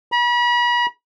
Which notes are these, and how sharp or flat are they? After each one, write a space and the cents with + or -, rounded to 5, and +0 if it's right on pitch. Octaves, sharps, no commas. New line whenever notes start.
B5 -40